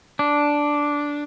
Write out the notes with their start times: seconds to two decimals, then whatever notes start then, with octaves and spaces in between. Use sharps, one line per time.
0.19 D4